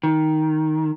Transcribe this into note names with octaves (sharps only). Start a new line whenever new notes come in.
D#3